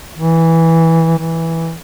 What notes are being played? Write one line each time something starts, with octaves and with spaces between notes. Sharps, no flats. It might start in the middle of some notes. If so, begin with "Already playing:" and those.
E3
E3